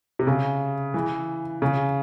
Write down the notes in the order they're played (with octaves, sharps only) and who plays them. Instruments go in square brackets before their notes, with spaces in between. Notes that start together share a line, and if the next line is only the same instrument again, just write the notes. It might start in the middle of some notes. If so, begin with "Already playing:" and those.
[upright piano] C3
C#3
E3
C#3